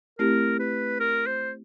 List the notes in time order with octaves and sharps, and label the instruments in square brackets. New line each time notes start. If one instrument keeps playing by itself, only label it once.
[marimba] A3 C4 E4 G4 [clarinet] A#4
[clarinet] B4
A#4
C5